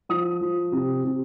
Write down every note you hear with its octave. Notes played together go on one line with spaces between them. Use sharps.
F3 D#6
F3
C3
C3